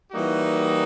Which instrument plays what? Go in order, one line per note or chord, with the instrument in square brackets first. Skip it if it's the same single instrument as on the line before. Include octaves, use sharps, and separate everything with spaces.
[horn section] E3 G3 A#3 D#4 F#4